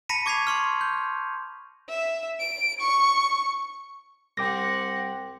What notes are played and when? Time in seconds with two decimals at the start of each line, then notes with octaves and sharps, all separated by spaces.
0.09 A5 B5 A#6 B6 C#7 D#7
0.26 C#6 D6 G#6 B6 C7 F7
0.47 C6 C#6 F6
0.81 G6
1.89 E5
2.40 D7
2.81 C#6
4.37 C2 C4 F#5 G5 D6 A#6